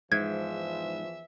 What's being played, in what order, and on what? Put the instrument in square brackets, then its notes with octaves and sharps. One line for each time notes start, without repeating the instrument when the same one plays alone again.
[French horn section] E2 E3 F3 [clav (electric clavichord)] G#2 [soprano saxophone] E5 [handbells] G#6